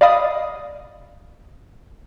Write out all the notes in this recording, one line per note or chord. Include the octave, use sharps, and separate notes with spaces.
D5 D#5 F5 B5 D#6